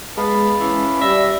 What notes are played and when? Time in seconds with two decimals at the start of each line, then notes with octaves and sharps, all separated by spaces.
0.17 G#3 B3 F5 A5 B5
0.60 E3 C#4
1.01 G3 D5 E5 A#6